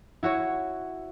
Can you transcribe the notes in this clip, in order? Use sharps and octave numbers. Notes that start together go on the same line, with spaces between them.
E4 F#4 C#5